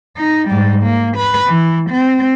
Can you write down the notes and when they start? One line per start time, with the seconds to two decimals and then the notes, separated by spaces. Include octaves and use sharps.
0.17 D#4
0.48 G#2 G3
0.83 A#3
1.17 B4
1.47 E3
1.90 C4